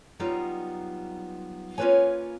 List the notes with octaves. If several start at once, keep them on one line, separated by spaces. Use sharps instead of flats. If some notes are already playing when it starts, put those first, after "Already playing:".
F#3 G3 B3 D#4 F4
A#3 C#4 F4 B4 C#5 G#5